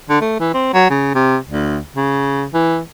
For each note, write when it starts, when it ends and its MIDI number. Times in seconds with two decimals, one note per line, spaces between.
0.09 0.19 50
0.21 0.39 57
0.40 0.53 52
0.54 0.71 60
0.73 0.87 54
0.90 1.10 49
1.15 1.37 48
1.48 1.79 38
1.96 2.45 49
2.54 2.80 52